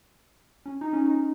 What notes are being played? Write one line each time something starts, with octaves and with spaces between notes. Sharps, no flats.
C#4
D#4
C#4
D#4